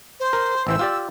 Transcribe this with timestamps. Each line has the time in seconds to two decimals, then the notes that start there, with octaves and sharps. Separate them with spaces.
0.19 C5
0.33 A#4
0.67 A1 E3 C5 E6
0.79 F4 G4 D5